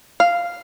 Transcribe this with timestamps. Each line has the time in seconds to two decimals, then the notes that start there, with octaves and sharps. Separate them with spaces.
0.20 F5